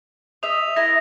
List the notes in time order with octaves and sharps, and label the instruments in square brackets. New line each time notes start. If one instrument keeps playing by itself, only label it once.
[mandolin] D#5 E5 [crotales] F7
[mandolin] E4 A#4 D#5 [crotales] A#6